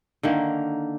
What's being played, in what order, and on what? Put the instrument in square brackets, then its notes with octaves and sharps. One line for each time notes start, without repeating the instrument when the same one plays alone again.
[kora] D3 D#3 A#3